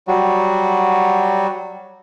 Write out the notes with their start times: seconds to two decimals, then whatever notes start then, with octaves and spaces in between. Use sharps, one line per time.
0.08 F#3 G3 F#4